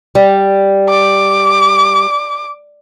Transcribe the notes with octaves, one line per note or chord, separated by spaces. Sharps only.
G3
D6